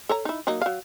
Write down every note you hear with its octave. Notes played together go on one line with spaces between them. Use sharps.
A4 C#5 A#5
D#4 E4
F#3 A#3 D#4
F#3 F5